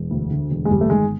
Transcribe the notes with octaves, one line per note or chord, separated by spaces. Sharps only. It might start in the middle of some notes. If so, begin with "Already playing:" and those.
Already playing: E1
D2
D3
E1
G#3
G1 G3
A3
D#3 G#3